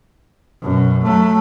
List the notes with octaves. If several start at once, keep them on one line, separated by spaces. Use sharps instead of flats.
F#2 B2
F#3 A3